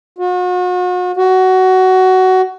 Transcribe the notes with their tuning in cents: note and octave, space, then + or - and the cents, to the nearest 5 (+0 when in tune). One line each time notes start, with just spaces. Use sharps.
F#4 -40
F#4 +15